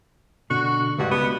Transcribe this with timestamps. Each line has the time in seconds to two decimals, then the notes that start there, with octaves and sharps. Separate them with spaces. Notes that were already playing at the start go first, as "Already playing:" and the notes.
0.50 B2 D3 F#4
0.99 C#2 G2 F#4
1.11 B3